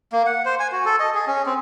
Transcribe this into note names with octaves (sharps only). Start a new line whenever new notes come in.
A#3
F#5
C5
G#5
F#4
A4
D#5
G#4
C#4
C4